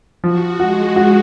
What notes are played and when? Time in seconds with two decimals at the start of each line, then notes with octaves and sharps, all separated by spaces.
0.23 F3 F#4
0.60 G#3 F#4
0.96 F#4